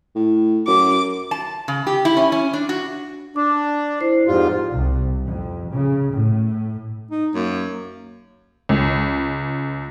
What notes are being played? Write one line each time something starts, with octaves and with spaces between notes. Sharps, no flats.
A2
F#2 D6
A5
C#3
G4
E4
C#4
C#4
D4
F#4
D4 D6
E4 C5 C7
F2 G#2 F4 G4 D5
C2
F2
C#3
A2
D#4
F#2 A#3
C#2